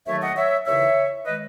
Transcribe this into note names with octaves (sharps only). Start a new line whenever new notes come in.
D#2 D#3 F#3 A3 C#5 E5
D#5 F#5
C#5 E5
D#2 C#3 E3 C#5 E5
D#3 G#3 B4 D#5